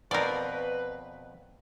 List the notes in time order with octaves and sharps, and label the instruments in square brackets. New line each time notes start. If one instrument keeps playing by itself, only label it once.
[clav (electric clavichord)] F2 B2 C4 [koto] A#4 D5 [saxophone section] B4